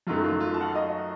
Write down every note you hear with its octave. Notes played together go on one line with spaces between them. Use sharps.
F#2 D#3 F#3 A3 F4
F4
F4
A5
F#5
F5
D#5